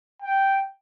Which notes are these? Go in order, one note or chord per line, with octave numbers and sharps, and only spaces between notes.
G5